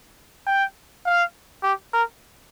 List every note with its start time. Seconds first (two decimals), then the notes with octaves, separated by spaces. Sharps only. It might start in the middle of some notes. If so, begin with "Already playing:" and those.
0.47 G5
1.05 F5
1.63 G4
1.93 A#4